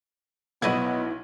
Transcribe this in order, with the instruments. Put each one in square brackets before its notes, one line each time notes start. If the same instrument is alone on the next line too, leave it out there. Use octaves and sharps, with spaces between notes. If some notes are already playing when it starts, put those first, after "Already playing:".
[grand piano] B1 G#6 [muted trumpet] B3 [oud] E4 D5 D#5